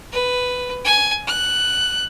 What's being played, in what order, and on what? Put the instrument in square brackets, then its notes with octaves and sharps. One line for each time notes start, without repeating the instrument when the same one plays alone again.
[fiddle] B4
G#5
F#6